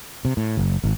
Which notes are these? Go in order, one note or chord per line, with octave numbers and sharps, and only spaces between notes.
C3
A2
F#1
G#1